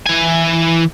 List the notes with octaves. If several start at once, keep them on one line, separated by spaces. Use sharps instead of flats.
E3 G#5